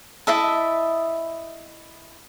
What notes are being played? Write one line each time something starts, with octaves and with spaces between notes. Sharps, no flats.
E4 D#5 E5 A5